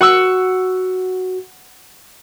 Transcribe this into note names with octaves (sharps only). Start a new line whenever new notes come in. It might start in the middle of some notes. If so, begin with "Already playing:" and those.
F#4 F#5 C#6 E6